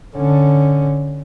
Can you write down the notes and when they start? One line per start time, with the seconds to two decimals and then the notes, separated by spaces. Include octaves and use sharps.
0.16 D3 C#4